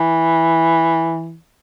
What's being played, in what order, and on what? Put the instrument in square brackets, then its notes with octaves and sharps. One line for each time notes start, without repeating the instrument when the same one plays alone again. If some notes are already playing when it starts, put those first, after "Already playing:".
Already playing: [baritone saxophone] E3